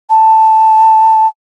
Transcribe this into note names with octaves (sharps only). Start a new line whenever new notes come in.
A5